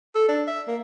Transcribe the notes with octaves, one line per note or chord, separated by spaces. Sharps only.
A4
D4
E5
A#3